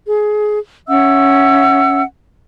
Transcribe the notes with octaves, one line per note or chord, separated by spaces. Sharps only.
G#4
C#4 E5 F#5 E6